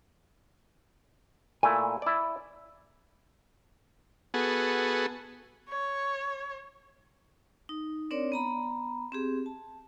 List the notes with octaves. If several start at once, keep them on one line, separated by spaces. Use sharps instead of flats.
A#2 A3 E4 G#5
E4 D5
B3 F#4 G#4 A4
C#5
D#4
C4 D4 A#4 C#5 D5
B3 A#5 B5
C4 G4 G#4
A5